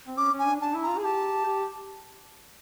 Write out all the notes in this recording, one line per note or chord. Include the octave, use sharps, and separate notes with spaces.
C4
C#4 D6
C#4
G#5
D4
D4 A5
E4
A#5
F4
G#4
G4 A5
G4